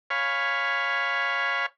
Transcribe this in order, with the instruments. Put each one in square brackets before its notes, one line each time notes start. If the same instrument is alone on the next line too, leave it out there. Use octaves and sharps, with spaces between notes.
[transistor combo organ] C#5 F5 G#5 B5